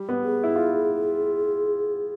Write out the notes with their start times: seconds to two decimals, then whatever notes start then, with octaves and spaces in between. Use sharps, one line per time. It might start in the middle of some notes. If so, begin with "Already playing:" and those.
Already playing: G3
0.09 B3
0.24 G#4
0.44 E4
0.56 F4